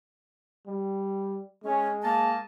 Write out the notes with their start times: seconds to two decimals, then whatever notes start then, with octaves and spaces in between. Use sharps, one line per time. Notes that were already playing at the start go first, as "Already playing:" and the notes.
0.67 G3
1.64 G#3 C#4
2.03 A#3 D#5 A5